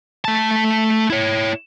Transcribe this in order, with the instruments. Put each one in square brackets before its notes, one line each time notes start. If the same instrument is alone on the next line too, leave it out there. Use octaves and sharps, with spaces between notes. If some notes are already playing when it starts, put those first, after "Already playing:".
[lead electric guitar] A3 A5
E4 C#5